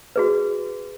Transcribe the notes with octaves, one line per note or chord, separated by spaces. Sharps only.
F#4 G#4 B4